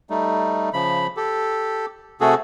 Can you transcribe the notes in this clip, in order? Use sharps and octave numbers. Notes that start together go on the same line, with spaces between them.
G3 A3 D#4
C#3 F3 B5
G4 A4
C3 A3 F#4 G#4 A4